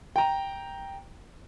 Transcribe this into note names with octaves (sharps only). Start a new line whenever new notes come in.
G5 A#5